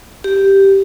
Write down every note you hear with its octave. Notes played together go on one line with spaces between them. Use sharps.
G4